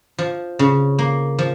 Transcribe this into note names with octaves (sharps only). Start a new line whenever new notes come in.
F3
C#3
A#3
F3